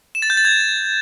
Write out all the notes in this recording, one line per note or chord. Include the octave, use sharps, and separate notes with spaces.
E7
A6
G6
A6
G#6